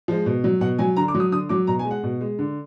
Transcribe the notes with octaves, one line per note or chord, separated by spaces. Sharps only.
F3 G#3
B2
F#3
B2 F#5
F#3 G#5
D3 A#5
D6
F#3
D#6
D3 D#6
F#3 D6
B2 A#5
G#5
G#3
F#5
B2
G#3
D3